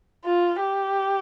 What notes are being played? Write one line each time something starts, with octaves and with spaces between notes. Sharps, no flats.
F4
G4